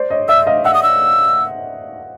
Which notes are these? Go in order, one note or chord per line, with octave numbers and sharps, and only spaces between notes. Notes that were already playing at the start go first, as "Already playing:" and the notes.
Already playing: C5 D5
C#5 D#5
D5 E5 E6
D#5 F5
E5 F#5 E6
D#6
E6